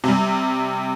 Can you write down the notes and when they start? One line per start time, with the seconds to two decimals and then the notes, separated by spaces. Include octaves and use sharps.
0.04 C3 G3